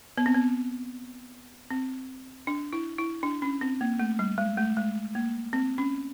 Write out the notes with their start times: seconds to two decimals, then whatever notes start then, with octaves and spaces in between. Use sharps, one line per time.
0.18 B3
0.26 C4
0.34 B3
1.71 C4
2.47 D4
2.73 E4
2.98 E4
3.23 D4
3.42 C#4
3.61 C4
3.81 A#3
3.99 A3
4.19 G3
4.38 G#3
4.57 A3
4.77 G#3
5.15 A#3
5.53 C4
5.78 C#4